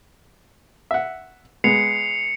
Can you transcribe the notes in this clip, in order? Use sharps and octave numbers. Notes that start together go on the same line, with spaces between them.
E5 F#5
G#3 B3 C7 C#7 F7